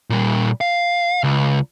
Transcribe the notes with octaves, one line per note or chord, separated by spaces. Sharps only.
A#2 G3
F5
C#2